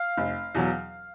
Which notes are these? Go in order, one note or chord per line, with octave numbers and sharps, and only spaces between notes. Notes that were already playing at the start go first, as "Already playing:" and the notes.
Already playing: F5
F1
E2 B2 F#3